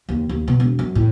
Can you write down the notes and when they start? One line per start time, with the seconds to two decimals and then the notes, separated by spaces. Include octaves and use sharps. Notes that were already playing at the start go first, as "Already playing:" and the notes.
0.09 D#2
0.29 D#2
0.48 B2
0.60 E1
0.79 F#2
0.95 A2